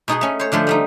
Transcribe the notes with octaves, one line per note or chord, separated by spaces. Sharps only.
B2 D#4 G#4 C6
A3 C#4
C5 C#5
D3 F3 A3 C5
G3 A3 D#4